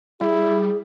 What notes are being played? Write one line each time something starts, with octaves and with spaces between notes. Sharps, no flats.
G3 E4 G#4